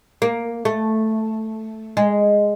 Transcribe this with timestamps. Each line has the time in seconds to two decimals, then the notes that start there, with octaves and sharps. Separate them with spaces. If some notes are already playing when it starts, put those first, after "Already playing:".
0.22 A#3
0.65 A3
1.97 G#3